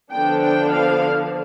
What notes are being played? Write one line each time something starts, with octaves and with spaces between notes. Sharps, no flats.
D3 F3 B3 D4 G5
G5
F5